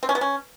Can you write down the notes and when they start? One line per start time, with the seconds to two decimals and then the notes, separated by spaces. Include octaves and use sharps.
0.03 C4
0.09 C#4
0.15 B3
0.21 C#4